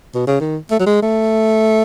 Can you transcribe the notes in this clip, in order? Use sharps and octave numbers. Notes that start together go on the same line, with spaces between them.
B2
C#3
D#3
A3
F#3
G#3
A3